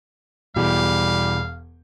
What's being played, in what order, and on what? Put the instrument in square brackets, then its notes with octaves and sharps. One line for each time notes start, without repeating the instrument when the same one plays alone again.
[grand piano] E1 E3 G4 [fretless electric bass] B2 [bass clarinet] G3 [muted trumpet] F5